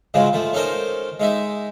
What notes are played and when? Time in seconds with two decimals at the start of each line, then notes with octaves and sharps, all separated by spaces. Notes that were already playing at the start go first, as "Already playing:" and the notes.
0.14 G#2 C#3 F3 F#3 G#3
0.33 F3 A3
0.53 C#4 D#4 A4 A#4 C5
1.20 G#3 D#4 E5